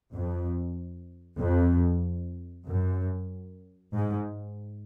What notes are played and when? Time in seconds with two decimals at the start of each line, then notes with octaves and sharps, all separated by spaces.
0.10 F2
1.38 F2
2.67 F#2
3.95 G#2